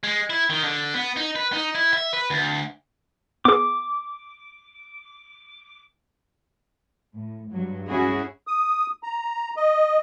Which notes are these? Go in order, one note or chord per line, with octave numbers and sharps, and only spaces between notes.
G#3
E4
D#3
D3
B3
D#4
B4
D#4
E4
E5
B4
D2
B3 G#4 D6
A2
G2 F#3
C#4 E4 F#4 G#4
D#6
A#5
D#5